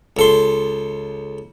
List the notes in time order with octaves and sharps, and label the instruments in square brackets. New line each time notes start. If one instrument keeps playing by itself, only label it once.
[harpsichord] C#2 A4 C6